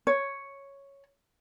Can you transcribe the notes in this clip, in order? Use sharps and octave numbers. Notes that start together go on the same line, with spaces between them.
C#5